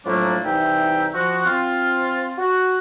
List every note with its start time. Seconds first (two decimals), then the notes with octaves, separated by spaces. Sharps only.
0.05 A2 F3 F#3 A3 A#3 D4
0.44 C2 E3 D#4 E5 G5
1.13 F3 F#4
1.45 C4 F4
2.38 F#4